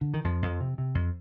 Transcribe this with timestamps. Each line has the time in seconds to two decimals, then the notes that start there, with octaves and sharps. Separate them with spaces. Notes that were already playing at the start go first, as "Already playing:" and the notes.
0.01 D3
0.14 D#3
0.24 F2 F3
0.42 F2
0.60 C3
0.78 C3
0.95 F2